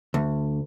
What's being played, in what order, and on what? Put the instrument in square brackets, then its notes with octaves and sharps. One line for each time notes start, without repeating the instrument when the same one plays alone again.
[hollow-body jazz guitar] D2